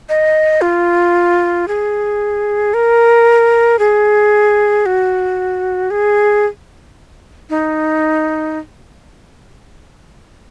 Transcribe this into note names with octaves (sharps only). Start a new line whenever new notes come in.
D#5
F4
G#4
A#4
G#4
F#4
G#4
D#4